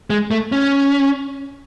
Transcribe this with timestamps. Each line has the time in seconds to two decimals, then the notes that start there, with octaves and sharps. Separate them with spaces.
0.10 G#3
0.31 A3
0.52 C#4